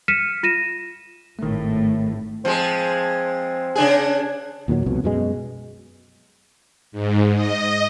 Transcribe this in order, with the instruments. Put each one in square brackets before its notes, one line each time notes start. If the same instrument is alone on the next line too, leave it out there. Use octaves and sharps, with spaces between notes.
[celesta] F6 B6 C#7 D#7 E7
F4 A#6 D#7 E7
[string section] G#1 A2 [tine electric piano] D#3 A3
[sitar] F3 G#3 [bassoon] C4
[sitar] C#3 D4 G#4
[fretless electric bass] D#2 A#2 D#3 F#3
C2 F2 B2
F#2 B2 G#3
[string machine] G#2
D#5